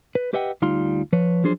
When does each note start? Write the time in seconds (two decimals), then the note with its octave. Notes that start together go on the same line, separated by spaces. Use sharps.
0.15 B4
0.33 G4 B4 D#5 E5 F#5 G5
0.62 D2 G3 D#4 F4 F5 C6
1.13 F3 B4 C#5
1.44 F3 F#3 D4 G#4 C5